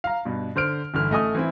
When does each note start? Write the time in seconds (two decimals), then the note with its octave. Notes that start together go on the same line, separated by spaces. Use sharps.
0.04 F5 A#5
0.25 G2 B2
0.56 D3 C5 F6 D7
0.94 G1 D3 E3 F6
1.10 A1 A3 D#5 G#5 D#6
1.35 E3 C4 E4